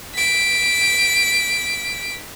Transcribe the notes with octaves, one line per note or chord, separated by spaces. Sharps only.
B6 D7